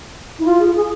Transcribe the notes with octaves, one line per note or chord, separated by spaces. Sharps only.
E4
F4
G#4
G#4